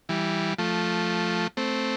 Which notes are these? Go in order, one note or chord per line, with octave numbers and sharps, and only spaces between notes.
E3 G3
F3 A3
A3 C4